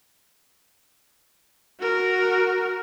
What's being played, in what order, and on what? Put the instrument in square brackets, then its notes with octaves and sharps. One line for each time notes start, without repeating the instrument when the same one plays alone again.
[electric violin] F#4 A#4